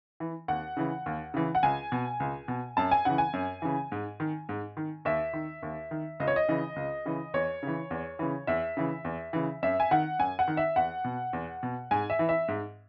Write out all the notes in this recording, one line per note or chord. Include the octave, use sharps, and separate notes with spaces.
E3
D#2 F#5
C#3 E3
D#2
C#3 E3
F#5
C#2 G#5
B2
C#2
B2
F#2 A5
G#5
C#3 E3 F#5
G#5
F#2
C#3 E3
G#2
D#3
G#2
D#3
D#2 E5
D#3
D#2
D#3
C#2 D#5
C#5
D#5
C#3 E3
C#2
C#3 E3
E2 C#5
C#3 E3
E2
C#3 E3
E2 E5
C#3 E3
E2
C#3 E3
F#2 E5
G#5
D#3 F#5
F#2 G#5
F#5
D#3
E5
E2 F#5
B2
E2
B2
G#2 G#5
E5
E3
E5
G#2